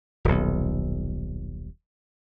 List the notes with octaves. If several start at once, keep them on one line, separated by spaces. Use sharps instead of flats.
D#1 B1